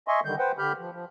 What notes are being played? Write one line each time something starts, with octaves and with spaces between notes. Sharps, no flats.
D#5 E5 G#5 C6 C#6
D3 D#3 G3 G6
B4 C5 F#5 G5
D3 G4 B5 F6 G6
F3
F3